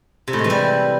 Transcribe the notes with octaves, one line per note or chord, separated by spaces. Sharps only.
C3
A2
G#3
E3
G3